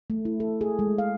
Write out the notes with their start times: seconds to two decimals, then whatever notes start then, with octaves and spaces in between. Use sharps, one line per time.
0.10 A3
0.25 E4
0.40 A4
0.61 G#4
0.79 G#3
0.98 F5